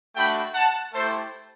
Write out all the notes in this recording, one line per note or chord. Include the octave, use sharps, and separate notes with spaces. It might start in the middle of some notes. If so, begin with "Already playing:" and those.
A3 D4 F#4 G5 B5
F#5 A5
A3 E4 G4 A4 C5